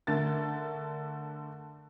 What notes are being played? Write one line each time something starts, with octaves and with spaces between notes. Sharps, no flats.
D3 A3 A#4 A6